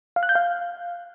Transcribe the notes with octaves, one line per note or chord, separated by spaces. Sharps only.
F5
F#6
G6
F5